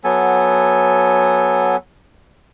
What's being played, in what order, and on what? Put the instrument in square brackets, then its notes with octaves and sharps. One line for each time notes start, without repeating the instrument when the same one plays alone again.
[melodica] F#3 B3 A4 G#5